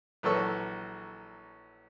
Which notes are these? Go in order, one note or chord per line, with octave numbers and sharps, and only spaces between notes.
A#1 E3 F#3 A4 C#6 E6